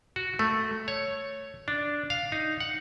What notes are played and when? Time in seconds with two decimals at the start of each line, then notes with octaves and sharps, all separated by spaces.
0.16 F#4
0.39 A3
0.88 C#5
1.68 D4
2.10 F5
2.32 D#4
2.60 F#5